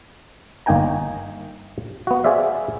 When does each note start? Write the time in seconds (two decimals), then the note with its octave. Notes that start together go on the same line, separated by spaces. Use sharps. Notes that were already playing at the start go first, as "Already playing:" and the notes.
0.66 G1 A#3 D#4 G5 G#5 A#5
2.07 B3 F#4
2.24 G#4 C5 D5 E5 F5